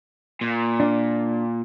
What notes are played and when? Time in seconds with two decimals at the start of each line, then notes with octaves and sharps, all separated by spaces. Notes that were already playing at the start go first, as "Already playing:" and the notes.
0.41 A#2
0.80 D4